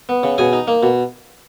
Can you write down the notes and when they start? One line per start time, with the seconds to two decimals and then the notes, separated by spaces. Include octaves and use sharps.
0.09 B3
0.23 C#3
0.38 B2 G#4 G#5
0.53 D#4
0.68 A#3
0.83 B2